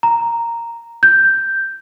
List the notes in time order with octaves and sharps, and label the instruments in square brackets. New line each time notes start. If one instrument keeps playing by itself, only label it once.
[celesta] A#5
G6